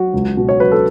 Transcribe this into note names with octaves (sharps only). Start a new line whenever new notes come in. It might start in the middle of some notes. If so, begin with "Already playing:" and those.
Already playing: F#3 F#4
C#2
B2
C#5
F#3 B4
A4